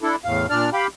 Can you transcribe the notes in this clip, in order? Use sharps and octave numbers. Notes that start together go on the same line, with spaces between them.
D4 E4 A4
E2 A2 F5
A#2 D4 D5 F6
G4 F5 G5 B5